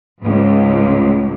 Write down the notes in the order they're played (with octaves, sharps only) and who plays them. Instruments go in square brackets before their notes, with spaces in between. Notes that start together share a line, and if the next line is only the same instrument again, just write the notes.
[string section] C#2 G#2